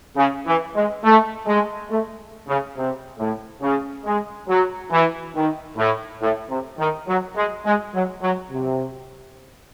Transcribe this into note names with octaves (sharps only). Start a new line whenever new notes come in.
C#3
E3
G#3
A3
G#3
A3
C#3
C3
A2
C#3
G#3
F#3
E3
D#3
A2
A2
C3
D#3
F#3
G#3
G#3
F#3
F#3
C3